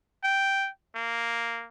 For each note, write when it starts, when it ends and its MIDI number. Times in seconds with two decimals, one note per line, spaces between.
0.24 0.69 79
0.95 1.67 58